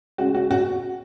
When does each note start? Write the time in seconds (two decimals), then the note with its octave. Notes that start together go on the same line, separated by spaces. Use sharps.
0.18 C#3 G#3 F#4
0.35 F#4
0.51 F#4